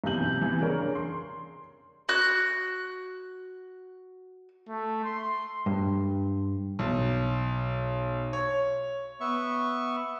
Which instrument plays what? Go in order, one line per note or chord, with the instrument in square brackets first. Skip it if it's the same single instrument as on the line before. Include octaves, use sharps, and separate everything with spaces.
[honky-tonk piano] B1 C3 E3 G6 F#7
C3 E3
C#3 D4 A#4 C#5
C6
[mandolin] F#4 F#6
[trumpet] A3
C6
[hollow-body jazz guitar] G2
[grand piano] B1
C#5
[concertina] B3 E5 C#6